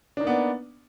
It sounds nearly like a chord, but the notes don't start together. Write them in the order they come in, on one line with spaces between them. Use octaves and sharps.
D4 D#4 A#3 B3 D5